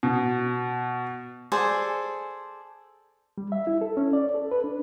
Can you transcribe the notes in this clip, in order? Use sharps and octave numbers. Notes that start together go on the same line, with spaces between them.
B2
G#4 A4 C5 D5
G3
E5
E4
A4
C#4
D5
A4
B4
D4